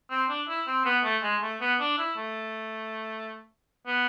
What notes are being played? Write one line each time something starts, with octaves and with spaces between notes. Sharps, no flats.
C4
D4
E4
C4
B3
A3
G#3
A3
B3
D4
E4
A3
B3